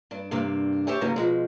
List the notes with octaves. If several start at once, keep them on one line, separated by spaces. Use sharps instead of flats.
G2 D4
G2 C3 A#3 D4
G4 C5 C#5 E5 A5
G#2 C#3 F#3 A#3 B3 D#4
B2 F3 G#3